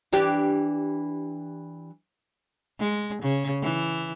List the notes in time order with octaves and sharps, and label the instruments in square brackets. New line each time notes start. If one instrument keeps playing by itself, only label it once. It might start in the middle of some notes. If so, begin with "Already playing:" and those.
[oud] E3 D4 G4
[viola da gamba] G#3
C#3
E3